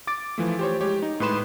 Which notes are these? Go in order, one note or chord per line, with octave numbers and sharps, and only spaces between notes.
D6 A6 D7
E3 F3 A3
G4 C5 C#5
G#3 G4 C#5
D#4
A2 G#3 B4 C6 E7